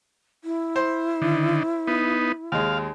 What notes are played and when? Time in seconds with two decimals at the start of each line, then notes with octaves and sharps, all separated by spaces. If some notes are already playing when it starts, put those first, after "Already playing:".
0.44 E4
0.76 C5
1.22 D3 D#3
1.87 B3 D#4
2.52 D#2 G#3 F5